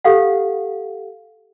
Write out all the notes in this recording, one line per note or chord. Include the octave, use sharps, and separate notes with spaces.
G4 A4 F5 F#5